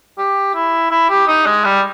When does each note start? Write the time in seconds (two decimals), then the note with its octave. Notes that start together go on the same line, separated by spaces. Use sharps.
0.18 G4
0.55 E4
0.91 E4
1.10 G4
1.28 D#4
1.46 G#3
1.65 G3